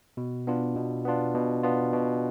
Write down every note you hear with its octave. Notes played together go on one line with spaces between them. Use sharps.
B2
B3 D4 F4
B2
B3 D4 F4
B2
B3 D4 F4
B2